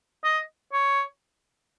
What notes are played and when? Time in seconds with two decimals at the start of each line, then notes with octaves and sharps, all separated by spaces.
0.24 D#5
0.73 C#5